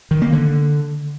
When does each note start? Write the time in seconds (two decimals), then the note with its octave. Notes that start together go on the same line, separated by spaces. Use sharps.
0.11 D#3
0.22 A#3
0.32 D3